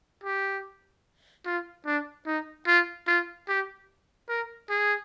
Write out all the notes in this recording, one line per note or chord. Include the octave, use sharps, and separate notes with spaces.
G4
F4
D4
D#4
F4
F4
G4
A#4
G#4